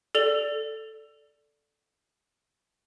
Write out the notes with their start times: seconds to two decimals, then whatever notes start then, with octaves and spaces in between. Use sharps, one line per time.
0.15 A4 D5 F7 G7